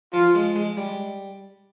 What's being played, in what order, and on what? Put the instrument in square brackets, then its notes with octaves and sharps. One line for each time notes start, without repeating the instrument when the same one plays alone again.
[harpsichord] F3 [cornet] F4
[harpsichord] G#3
G#3
G3